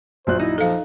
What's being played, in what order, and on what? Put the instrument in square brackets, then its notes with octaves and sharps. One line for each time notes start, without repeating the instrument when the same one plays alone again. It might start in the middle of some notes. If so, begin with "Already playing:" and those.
[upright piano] A#1 F#2 F#6 [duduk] C5
[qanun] D#4 [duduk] E4
[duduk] F3 [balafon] A4 F5